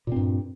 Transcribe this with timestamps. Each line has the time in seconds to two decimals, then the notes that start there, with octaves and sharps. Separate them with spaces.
0.07 A#2
0.12 C4
0.16 G2